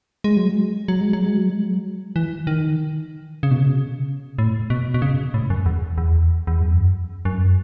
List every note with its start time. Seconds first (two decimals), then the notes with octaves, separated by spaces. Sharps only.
0.24 G#3
0.37 F#3
0.50 G#3
0.88 F#3
1.01 G#3
1.13 F#3
1.26 G#3
1.38 F#3
1.50 G#3
1.63 F#3
2.16 E3
2.47 D#3
3.43 C#3
3.51 B2
3.60 C#3
4.38 A2
4.70 B2
4.94 B2
5.02 C#3
5.34 A2
5.50 F#2
5.66 E2
5.98 E2
6.47 E2
6.61 F#2
7.25 F#2